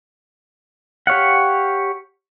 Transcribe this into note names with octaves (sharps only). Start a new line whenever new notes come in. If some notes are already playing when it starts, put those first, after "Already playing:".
G4 C#5 F5 F#5